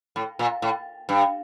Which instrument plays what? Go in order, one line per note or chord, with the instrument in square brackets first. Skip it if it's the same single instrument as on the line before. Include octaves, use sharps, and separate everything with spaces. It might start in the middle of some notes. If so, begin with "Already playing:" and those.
[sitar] A2
A#2
A2
G2